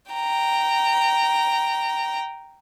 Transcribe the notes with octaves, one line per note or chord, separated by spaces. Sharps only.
G5 A#5